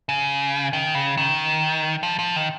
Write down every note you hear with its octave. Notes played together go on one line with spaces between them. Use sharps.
C#3
D#3
C#3
D#3
F3
F3
D#3